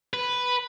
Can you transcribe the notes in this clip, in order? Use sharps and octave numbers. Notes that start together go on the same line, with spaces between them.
B4